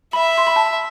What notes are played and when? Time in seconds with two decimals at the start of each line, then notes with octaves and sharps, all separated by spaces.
0.13 E5 B5
0.38 C6
0.47 B5
0.56 A5